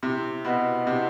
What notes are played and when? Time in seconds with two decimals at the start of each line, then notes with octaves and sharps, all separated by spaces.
0.03 C3 E4
0.45 B2 B4 D#5 F#5
0.87 C3 E4